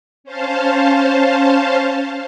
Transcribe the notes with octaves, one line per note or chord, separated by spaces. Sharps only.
C#4 C5 F5 A5